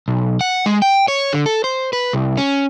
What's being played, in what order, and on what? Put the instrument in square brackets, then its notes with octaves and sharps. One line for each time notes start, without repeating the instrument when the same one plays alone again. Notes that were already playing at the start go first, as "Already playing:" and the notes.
[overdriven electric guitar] B1
F#5
G#3
G5
C#5
D3
A4
C5
B4
C2
C#4